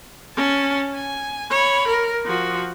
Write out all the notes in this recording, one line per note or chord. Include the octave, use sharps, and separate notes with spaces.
C#4 A5
G#5
C#5 B5
A#4
F3 F#4